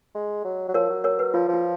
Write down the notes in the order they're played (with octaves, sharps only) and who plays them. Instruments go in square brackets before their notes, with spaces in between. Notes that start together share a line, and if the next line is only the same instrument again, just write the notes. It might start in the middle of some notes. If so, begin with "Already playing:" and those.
[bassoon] G#3
F#3
F#3
[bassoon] F3 [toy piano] A#4 C#5
[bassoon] F#3
[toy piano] A#4 C#5
B4
[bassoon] F3 [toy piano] F4
[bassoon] F3
[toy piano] F4